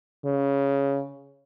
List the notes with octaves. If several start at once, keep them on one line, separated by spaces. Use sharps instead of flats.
C#3